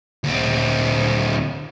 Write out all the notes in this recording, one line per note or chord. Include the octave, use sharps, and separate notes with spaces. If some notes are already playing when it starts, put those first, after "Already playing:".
D2 C4